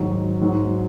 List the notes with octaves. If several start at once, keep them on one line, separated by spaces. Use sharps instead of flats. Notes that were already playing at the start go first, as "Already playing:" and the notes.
Already playing: G#2 D#3 F#3
G#2 F#3